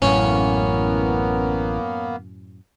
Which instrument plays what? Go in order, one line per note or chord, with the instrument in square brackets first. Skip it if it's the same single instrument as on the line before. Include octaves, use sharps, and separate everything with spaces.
[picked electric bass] A1 [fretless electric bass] F#2 A2 [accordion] A#3 B3 [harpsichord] C#4